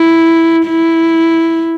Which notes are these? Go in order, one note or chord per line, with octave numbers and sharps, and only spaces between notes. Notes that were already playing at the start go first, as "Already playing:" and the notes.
Already playing: E4
E4